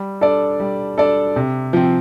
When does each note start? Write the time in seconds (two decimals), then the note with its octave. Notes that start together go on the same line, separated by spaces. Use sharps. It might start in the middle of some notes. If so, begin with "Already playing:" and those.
Already playing: G3
0.21 D4 A4 D5
0.60 G3
0.98 D4 A4 D5
1.36 C3
1.73 F3 C4